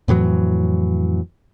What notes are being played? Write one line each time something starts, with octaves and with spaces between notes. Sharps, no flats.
F2 A2 E3 F#3